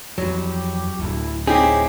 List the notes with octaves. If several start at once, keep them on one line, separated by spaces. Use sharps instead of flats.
F2 E3 F#3 G4
D1 D2 E4
C4 D#4 E4 G4 G#4 C#5